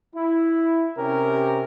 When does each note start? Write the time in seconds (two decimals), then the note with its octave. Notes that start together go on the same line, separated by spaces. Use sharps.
0.14 E4
0.97 C3 C#4 G4 A#4